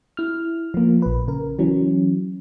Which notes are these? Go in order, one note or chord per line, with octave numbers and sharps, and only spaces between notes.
E4 F6
F3 A#3
A#1 B4
C#3 A#4
E3 F#3 C#4